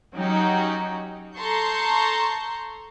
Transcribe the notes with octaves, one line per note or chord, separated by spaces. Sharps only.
F#3 C#4 D#4 F#4 G4
A4 A5 A#5 C6 C#6 G6